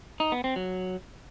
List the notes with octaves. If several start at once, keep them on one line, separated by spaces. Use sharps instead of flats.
D#4
B3
C4
F#3